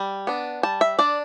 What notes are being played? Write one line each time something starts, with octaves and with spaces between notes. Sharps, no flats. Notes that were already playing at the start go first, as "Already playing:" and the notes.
Already playing: G3
B3 D4
G3 A5
E5
D4 D5